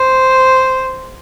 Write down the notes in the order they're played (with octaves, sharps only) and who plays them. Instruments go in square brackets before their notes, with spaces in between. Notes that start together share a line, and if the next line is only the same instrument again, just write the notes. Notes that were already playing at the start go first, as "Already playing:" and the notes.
Already playing: [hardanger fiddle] C5